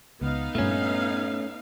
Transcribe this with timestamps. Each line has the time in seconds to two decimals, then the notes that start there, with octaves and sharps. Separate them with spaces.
0.21 C#2 B3 D#4 F5
0.55 G2 A#2 A3 C#4